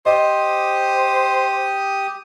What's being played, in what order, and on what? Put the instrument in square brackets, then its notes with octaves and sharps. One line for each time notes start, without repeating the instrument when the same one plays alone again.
[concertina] G4 D#6 [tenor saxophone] C5 [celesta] D#5